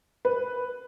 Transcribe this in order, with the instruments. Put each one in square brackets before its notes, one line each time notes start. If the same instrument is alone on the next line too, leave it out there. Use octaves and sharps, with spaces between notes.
[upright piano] B4